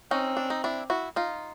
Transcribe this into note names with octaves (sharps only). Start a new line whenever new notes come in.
C4 C#4 D#4
D4
D#4
D4 E4
E4 F#4
D#4 F4